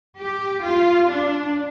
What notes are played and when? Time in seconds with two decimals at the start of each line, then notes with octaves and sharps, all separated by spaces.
0.20 G4
0.65 F4
1.10 D4